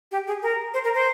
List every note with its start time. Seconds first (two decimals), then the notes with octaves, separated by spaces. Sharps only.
0.12 G4
0.27 G#4
0.43 A#4
0.74 C5
0.84 A#4
0.94 C5